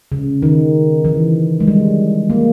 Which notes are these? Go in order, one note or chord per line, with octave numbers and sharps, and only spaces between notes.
C#3
D#3
E3
G#3
G3
A#3